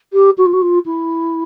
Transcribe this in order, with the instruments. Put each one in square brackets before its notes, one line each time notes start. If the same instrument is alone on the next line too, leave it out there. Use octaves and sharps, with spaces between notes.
[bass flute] G4
F#4
F4
F#4
F4
E4